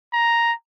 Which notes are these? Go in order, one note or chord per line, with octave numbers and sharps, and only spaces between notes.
A#5